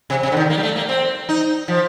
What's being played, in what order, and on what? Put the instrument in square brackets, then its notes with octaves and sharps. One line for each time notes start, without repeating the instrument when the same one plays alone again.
[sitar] C3
C3
D3
D#3
A#3
G3
A3
A#3
C4
D#4
F3